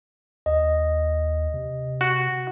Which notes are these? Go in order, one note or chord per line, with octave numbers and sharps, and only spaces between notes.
D#2 D#5
C3
F#4